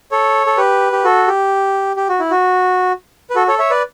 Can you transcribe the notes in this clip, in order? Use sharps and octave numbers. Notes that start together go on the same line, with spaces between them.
A4 C#5
A4
G4 B4
G4
F#4 A4
G4
G4
F#4
E4
F#4
B4
F#4 A4
A4 C#5
C#5 E5
B4 D5